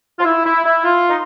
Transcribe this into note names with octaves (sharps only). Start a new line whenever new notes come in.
F4
E4
E4
E4
F4
D#4